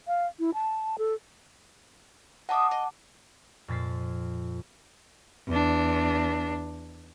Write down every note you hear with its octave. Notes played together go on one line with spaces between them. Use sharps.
F5
E4
A5
A4
D#5 E5 F#5 A5 D6 D#6
D#5
F2 A#2 A6 B6 C7
E2 D4